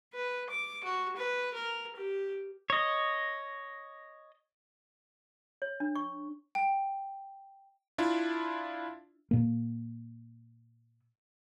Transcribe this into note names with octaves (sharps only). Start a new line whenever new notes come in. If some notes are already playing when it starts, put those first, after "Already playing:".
B4
D6
F#4
B4
A#4
G4
C#5 D#5
C#5
D4
C#6
G5
D4 E4 F4
A#2 A#3